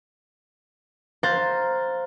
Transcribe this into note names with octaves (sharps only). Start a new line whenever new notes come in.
C5 F5 A#5 F#6 A6